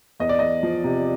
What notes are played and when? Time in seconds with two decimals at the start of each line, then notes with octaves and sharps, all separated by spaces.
0.20 E2 D#5
0.29 D5
0.39 E2 D#5
0.63 F3
0.84 C3